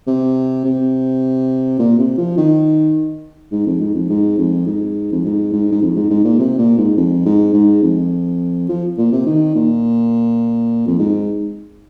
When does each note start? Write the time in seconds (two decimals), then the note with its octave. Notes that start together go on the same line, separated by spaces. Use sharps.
0.07 C3
0.65 C3
1.79 A#2
1.98 C3
2.18 F3
2.37 D#3
3.52 G#2
3.66 F2
3.81 G#2
3.95 F2
4.10 G#2
4.38 F2
4.67 G#2
5.12 F2
5.25 G#2
5.53 G#2
5.72 G#2
5.82 F2
5.96 G#2
6.10 G#2
6.25 A#2
6.39 C3
6.58 A#2
6.78 G#2
6.97 F2
7.26 G#2
7.54 G#2
7.83 F2
8.69 F3
8.98 A#2
9.12 C3
9.26 D#3
9.55 A#2
10.87 F2
10.99 G#2